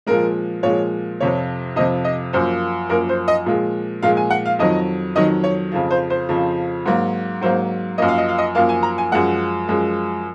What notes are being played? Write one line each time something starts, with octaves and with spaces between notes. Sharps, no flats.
A#2 F3 G#3 A#4
A#2 F3 G#3 C#5
F2 C3 F3 C#5
F2 C3 F3 D#5
D#5
F#2 F3 A#3 C5
F#2 F3 A#3 A#4
C5
D#5
A#2 F3 G#3
A#2 F3 G#3 F5
G#5
F#5
F5
F2 D#3 F#3 D#5
F2 D#3 F#3 D#5
C#5
F2 C#3 F3
C5
C5
F2 C#3 F3
G#2 F#3 A#3
G#2 F#3 A#3 C5
F#2 F3 A#3 D#5
F5
D#5
F5
D#5
F#2 F3 A#3 F5
G#5
A#5
G#5
F#2 F3 G#3 F#5
F#2 F3 G#3